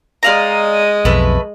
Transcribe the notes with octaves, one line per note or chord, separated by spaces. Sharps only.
G#3 D5 D#5 F5 A#5
B1 F2 A3 B4